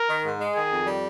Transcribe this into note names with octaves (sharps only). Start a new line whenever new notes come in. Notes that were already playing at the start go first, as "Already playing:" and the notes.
Already playing: A#4
D#3
G#2
G#3
D#3 G#4
F2
G3